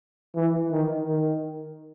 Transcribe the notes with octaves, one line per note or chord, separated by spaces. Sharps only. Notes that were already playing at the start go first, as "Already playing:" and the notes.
E3
D#3
D#3